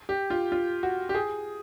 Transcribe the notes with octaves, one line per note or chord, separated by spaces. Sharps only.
G4
F4
F4
F#4
G4
G#4